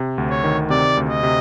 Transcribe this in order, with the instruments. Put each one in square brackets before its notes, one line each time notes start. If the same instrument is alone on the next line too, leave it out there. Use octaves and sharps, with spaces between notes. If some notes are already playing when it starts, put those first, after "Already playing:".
Already playing: [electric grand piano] C3
D2
[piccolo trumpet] C#5
[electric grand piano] D#3
[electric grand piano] C3 [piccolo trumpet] D5
[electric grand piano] D2
[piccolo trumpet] D#5
[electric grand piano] C3